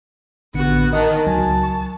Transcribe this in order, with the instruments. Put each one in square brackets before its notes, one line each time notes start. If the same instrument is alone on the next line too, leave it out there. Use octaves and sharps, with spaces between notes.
[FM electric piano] A1 D3 C#7 [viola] B3 F#4
[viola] D#3 A5 [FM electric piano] D#5
[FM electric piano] C#2 F#3 G#5 [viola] A5
[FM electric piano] C#6